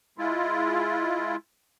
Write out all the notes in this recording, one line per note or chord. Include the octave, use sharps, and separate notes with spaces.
G#3 E4 F4